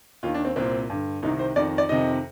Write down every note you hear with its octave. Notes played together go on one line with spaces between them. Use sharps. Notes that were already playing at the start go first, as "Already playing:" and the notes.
D#2 D#3 F4
D4
C4
C2 A#2 C4
G2 D3
C2 C3 D#3 D#4
C5
F2 D#3 D5
D5
F2 C3 D#3 D#5